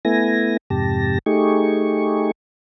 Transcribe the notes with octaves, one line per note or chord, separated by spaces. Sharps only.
A3 B3 E4 G#5 A#6
F2 G#2 C3 G4 A5 A#6
A3 D#4 G4 G#4 C#6